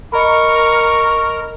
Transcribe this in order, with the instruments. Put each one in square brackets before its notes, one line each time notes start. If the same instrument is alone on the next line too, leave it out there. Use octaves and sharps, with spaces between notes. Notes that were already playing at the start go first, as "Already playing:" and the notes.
[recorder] A#4 [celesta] D#5 A#5 B5 [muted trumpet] C#6